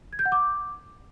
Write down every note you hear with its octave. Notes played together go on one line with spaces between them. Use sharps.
G#6
G6
F#5
D6